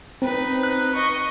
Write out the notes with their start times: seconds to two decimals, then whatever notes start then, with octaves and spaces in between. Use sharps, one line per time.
0.22 C4 D#4 B4
0.63 F#6
0.94 D#5 C#6